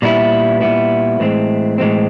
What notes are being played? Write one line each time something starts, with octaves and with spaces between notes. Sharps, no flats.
A#2 G3 B3 E4
A#2 G3 B3 E4
A2 E3 G#3 C4
A2 E3 G#3 C4